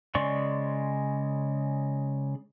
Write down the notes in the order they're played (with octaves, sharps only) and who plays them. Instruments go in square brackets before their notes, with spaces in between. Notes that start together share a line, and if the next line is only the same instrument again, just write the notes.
[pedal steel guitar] C#3 G#3 D5 C6 C#6